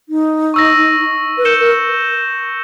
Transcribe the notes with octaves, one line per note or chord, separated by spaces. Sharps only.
D#4
C#6 E6 A#6
B4
A#4 G6 C#7 E7 G7
A#4